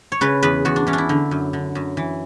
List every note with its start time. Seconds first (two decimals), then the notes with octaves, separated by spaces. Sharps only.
0.12 C#5
0.21 C#3 B4
0.43 E2 B4
0.65 E2 F#4
0.76 D4
0.87 E3 C#4
0.93 D4
0.98 E4
1.09 D3
1.31 F#2
1.53 D3
1.75 F#2
1.97 E3